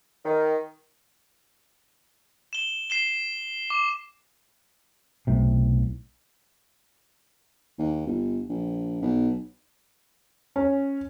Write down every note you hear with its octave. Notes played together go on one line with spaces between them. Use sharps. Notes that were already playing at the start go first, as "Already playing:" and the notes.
D#3
E7 G7
C7 E7 G7
D6
B1 A2 C3
D#2
G1
A#1
B1
C#4